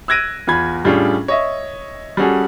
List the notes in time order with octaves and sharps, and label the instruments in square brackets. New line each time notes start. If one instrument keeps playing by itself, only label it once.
[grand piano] E6 F#6 G#6 A#6 D7 D#7
E2 F4 B5 G#6
A2 G3 C#4 D4 F4 G#4
C#5 D#5 E5
G3 C#4 F#4 G#4 A4